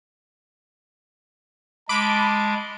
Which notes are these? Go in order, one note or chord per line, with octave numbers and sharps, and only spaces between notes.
G#3 A5 B5 D6 D7